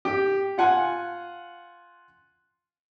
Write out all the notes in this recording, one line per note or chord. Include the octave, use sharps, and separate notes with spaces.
G4
F4 F#5 G#5